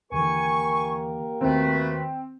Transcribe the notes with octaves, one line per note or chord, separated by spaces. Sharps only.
D#2 D3 E3 A#3 G4 A#4 G#5 C#6
D#2 D#3 A3 C4 F#4 B4